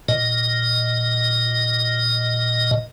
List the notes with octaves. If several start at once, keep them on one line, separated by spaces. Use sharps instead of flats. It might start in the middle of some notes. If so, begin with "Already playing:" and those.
A#2 D#5